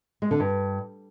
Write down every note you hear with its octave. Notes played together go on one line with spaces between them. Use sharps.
G#3
D3
G2